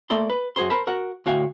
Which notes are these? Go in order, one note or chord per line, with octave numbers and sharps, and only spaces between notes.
A3 A#3 A4 D5 C6
B4
F#2 F#4 G#4 C5 C6
A#4 C5 A5 B5
F#4 A#4 F#5
D2 A2 F#4 F5 G5 G#5